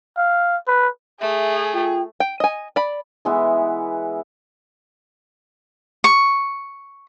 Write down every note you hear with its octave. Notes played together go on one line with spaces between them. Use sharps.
F5
B4
A3 G#4 E5
F4 G5
G5
D#5 G#5
D5 B5
E3 G#3 B3 E4
C#6